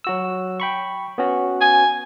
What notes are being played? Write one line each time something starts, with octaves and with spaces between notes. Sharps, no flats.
F#3 F#4 E6
G5 B5 C#6
B3 C#4 F#4
G#5